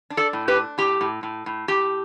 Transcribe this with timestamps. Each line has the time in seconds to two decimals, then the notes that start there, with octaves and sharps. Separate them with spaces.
0.10 D4
0.17 A4 D5
0.33 A2
0.48 G4 B4
0.55 D4
0.78 A2 G4
1.01 A2
1.23 A2
1.46 A2
1.68 A2 G4